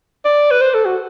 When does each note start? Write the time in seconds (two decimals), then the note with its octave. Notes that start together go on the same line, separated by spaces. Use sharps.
0.25 D5
0.51 B4
0.61 C5
0.74 A4
0.85 F#4